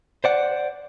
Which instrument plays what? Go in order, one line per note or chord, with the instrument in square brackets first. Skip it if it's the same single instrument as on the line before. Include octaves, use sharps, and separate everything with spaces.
[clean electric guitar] C5 D5 F#5